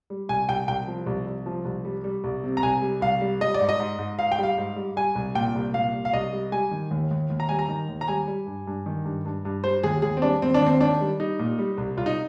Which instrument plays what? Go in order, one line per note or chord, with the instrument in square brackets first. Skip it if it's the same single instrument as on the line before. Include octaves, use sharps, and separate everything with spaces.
[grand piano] G3
C2 G#5
C2 G5
C2 G5
F3
C2
C2
F3
C2
G3
G3
C2
C3
A#5
C2 G#5
G3
C2 F5
G3
G3 D#5
D5
G#2
D#5
G#2
G#2
G#2 F5
G5
G3 F5
G#2
G3
G3 G#5
C2
A#2 G5
C2
A#2 F5
C2
F5
C2 D#5
G3
G3 G#5
D#3
D#2
D#2
D#2
A#5
G3 G#5
A#5
D#3
D#2
A#5
G3 G#5
G3
G2
G2
D#3
G2
G2
G2
G3 C5
D#2 G#4
D#2 G#4
C4
G3 D4
D#2 C4
D4
D#2
C4
D#3 D4
G3
G3 D#4
A#2
G3
C2
C2 F4
D#4